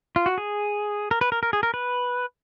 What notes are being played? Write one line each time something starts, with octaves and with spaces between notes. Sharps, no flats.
F4
F#4
G#4
A#4
B4
A#4
A#4
G#4
A#4
B4